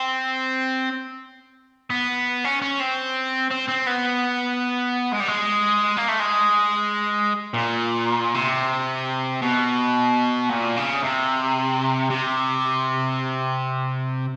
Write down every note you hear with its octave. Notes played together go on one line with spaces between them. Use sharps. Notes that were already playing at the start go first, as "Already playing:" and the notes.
Already playing: C4
B3
C#4
C#4
C4
C4
C4
B3
G#3
G3
G#3
A#3
A3
G#3
A#2
C3
B2
A#2
C#3
C3
C3